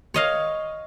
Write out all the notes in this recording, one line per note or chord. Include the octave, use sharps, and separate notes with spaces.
C#5 D#5 F5